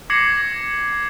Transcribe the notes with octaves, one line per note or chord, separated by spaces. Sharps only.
D6 G#6 A#6 C7 C#7 F#7